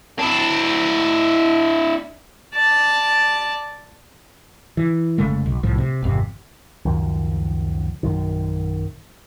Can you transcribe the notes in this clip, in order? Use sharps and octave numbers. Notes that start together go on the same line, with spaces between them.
D4 E4
D5 A5
E3
F1 C#3 G#3 A3
B1
C2 A2 F3
C3
G#1 F2 C3
C#2 F#2 D#3 F3
A#1 F#2 D#3